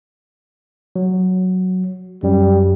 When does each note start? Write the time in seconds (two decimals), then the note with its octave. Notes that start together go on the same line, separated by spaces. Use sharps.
0.96 F#3
2.23 F#2 G3